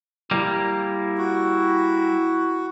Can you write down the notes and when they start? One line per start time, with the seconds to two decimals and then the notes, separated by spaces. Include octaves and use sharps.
0.31 G3 A#3 E4
1.18 F#4